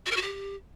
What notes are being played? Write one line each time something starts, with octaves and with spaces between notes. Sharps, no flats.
F#4
A#4
F#4
G4